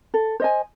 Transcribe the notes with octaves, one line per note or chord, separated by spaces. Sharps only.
A4
C5 D#5 G#5